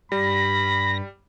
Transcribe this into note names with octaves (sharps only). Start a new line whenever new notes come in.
G2 G3 B5 A#6